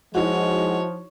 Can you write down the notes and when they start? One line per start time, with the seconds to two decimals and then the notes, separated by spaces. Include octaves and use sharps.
0.15 F3 G#3 D#4 E4 F#4 C#5